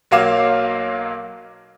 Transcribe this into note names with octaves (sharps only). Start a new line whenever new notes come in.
B1 F#3 A#3 F5 D6 E7